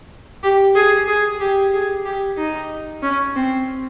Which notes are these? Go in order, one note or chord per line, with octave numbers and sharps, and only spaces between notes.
G4
G#4
G#4
G4
G#4
G4
D#4
C#4
C4